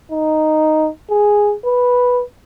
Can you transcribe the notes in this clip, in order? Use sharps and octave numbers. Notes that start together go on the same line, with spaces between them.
D#4
G#4
B4